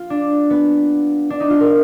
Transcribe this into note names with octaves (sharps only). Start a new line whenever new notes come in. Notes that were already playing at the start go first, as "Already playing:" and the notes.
Already playing: F4
D4
B3
D4
D#4
F4
A#4